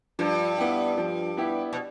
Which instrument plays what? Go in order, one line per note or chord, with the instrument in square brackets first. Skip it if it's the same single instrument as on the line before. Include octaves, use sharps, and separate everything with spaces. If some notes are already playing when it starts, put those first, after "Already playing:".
[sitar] G2 [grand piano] F3
[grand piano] B3 E4 G4
F3
B3 E4 G4
[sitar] B2